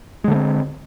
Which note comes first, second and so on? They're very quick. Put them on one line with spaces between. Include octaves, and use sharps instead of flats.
G#3 D3 A3 C4